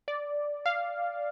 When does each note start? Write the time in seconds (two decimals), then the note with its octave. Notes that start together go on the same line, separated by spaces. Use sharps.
0.08 D5
0.66 F5